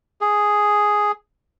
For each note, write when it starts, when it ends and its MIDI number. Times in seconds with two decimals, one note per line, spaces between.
0.21 1.12 68